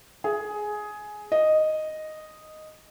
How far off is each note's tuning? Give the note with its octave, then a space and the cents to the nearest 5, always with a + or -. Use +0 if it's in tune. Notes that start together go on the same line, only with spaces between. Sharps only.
G#4 +10
D#5 -5